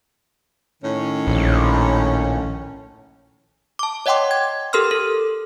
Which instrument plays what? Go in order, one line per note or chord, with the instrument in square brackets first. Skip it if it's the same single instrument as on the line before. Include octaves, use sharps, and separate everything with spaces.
[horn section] A2 D#3 C#4
[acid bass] A#1
[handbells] A5 D6
C#5 D#5 F#5 G5 C6 D6
G#6
G4 A4 A#4 C6 E6 F6
A4